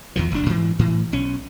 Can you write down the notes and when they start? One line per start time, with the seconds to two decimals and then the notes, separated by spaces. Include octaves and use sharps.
0.16 E2 D#3 F3
0.32 F1 D4
0.46 G#2 E3
0.79 A2 E3
1.12 B1 C#4